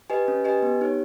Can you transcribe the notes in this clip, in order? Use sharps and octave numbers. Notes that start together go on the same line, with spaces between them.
G4 B4 D#5 G#5
C#4
G4 B4 D#5 G#5
B3
D#4 G4 C#5